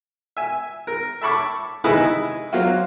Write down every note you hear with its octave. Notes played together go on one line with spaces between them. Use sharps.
E5 G#5
A#4
E5 A5 B5 C#6 D6
C3 D#3 D#4 E4 G#4 B4
F#3 A#3 C4 F4 F#4